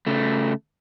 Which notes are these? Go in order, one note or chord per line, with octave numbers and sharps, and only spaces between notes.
C#3 A3